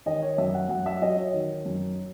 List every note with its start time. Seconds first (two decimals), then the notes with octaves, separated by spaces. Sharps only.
0.06 D#3 D#5
0.22 C#5
0.38 F#2 E5
0.54 F#5
0.69 F#2 F#5
0.86 E5
1.02 F#3 D#5
1.17 C#5
1.34 D#3
1.65 F#2